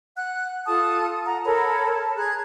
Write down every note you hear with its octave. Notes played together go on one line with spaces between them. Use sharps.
F#5 F#6
F4 A4 A5 D#6
F#5 A#5
A4 A#4 C#5 B5
A5
G#4 A#5 F#6 G#6